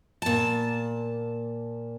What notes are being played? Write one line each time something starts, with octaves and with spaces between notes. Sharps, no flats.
A#2 A5